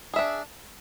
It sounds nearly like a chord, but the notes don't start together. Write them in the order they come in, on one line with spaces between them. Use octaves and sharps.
G#4 E5 D4